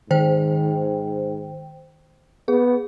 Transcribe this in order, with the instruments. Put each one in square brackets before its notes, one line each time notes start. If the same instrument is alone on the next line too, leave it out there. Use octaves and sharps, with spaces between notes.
[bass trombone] G#2 [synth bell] D#3 C5 G5
[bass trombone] B3 [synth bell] G#4